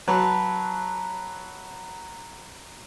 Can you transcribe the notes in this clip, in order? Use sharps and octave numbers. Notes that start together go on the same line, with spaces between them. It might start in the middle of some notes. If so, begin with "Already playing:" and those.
F#3 B4 A5